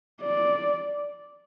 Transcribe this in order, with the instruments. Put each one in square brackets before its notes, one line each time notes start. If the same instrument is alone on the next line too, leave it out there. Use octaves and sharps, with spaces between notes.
[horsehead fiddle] D5